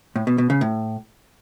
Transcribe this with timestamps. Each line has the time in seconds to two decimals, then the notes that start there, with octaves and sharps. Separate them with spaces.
0.16 A2
0.27 B2
0.38 B2
0.50 C#3
0.61 A2